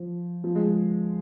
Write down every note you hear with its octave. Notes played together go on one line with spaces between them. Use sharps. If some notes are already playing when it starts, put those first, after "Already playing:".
Already playing: F3
F3
G#3